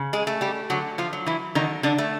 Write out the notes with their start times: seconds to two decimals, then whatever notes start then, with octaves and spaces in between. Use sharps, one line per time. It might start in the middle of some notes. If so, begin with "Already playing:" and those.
Already playing: C#3
0.13 G#3 G#4
0.27 A3
0.41 G3 G4
0.70 D3 F#3 F#4
0.98 F3 F4
1.13 F#3
1.26 E3 E4
1.55 D3 D#3 D#4
1.83 D3 D4
1.98 A3